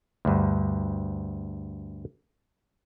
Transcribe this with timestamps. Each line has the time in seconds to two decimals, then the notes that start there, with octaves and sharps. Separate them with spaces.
0.25 D2 G2